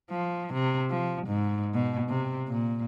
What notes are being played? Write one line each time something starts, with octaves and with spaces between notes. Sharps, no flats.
F3
C3
F3
G#2
B2
C3
A#2